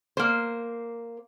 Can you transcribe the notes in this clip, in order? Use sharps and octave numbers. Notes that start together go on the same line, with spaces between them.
A#3 C5